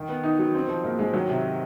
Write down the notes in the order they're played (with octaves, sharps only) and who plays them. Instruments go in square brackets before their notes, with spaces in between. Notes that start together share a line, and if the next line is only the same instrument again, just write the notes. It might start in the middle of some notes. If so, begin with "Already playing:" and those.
Already playing: [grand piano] D#3
B3
[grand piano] D#3 [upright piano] D#4
[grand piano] F#3
C4
F3
[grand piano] G#2 [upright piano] A#3
[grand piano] G#2 [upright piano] G#3
[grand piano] D#3 [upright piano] F#3
[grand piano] C3